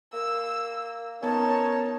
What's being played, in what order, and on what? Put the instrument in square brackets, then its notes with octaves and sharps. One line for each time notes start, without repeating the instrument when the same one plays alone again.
[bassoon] A#3 [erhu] E6
[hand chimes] B3 A#4 [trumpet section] C#4 D#4 C#5 [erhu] A5